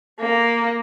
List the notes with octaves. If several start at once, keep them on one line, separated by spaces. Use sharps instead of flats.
A#3